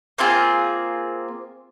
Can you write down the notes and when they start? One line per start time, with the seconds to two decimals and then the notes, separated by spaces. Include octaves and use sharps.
0.18 A#3 C4 F4 G#4